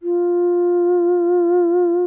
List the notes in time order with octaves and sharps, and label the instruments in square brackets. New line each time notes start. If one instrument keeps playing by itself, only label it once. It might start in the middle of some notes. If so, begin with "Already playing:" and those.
[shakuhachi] F4